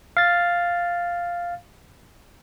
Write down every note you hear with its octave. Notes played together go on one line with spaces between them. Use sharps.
F5 A6